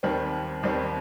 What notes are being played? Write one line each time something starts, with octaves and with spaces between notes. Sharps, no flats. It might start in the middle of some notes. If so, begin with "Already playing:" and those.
D#2 D#3 G3 C4
D#2 D#3 G3 C4